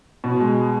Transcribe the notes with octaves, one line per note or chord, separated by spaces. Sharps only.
B2
G#3